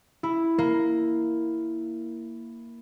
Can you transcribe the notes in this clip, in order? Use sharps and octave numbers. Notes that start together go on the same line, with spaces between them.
E4
A#3